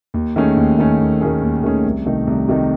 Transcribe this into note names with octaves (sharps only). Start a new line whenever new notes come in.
D#2
D#3 A3 C#4 G#4
D#2
D#3 A3 C#4 G#4
D#2
D#3 A3 C#4 G#4
D#2
D#3 A3 C#4 G#4
C2
C3 D#3 A3 D#4
C2
C3 D#3 A3 D#4